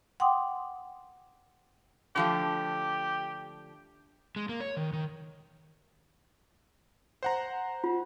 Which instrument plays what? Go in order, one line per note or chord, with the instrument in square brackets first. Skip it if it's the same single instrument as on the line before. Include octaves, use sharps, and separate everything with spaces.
[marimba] F#5 G5 C6 D6 D#6
[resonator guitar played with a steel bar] D3 F3 A3 [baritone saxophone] G4
[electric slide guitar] G#3
A#3
C#5
D#3
D#3
[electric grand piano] C5 F#5 A#5
[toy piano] F4